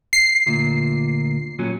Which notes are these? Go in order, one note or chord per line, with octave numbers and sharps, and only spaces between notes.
C7
D2 A#2
A#2 F#3 C#4